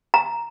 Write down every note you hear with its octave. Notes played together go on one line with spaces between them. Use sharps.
A#5